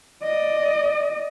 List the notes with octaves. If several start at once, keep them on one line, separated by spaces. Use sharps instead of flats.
D5 D#5